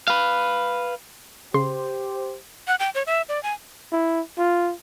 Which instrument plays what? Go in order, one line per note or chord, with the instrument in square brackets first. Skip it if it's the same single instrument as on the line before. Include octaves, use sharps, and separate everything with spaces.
[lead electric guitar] B4 F5
[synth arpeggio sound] C#3 C6 [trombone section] G4 C5
[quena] F#5
G5
C#5
E5
D5
G#5
[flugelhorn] E4
F4